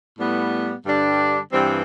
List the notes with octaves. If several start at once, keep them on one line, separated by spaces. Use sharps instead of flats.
A2 G3 B3
G2 D3 G3 D4
G2 E3 G3 C4